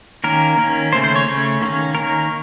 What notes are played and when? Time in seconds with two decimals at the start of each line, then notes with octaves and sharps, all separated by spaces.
0.24 D#3 A#3 C#4 A#4
0.58 D#3 A#3 C#4
0.92 C#3 A3 C#4 C5
1.04 C5
1.16 C#5
1.27 C#3 A3 C#4
1.61 D#3 A#3 C#4
1.95 D#3 A#3 C#4 A#4